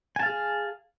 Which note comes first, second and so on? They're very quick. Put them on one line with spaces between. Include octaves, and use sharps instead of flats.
G#5 A5 F5 G#4